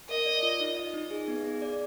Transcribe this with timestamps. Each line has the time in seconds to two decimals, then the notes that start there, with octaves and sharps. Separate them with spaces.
0.09 A#4 D#5
0.26 D5
0.43 F4
0.60 D#4
0.77 D#5
0.94 D#4
1.11 G#4
1.28 B3
1.44 G#4
1.62 D5